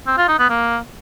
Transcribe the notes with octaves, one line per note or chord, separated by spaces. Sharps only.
C4
F4
D#4
B3
A#3